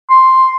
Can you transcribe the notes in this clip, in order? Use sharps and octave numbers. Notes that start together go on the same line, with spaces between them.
C6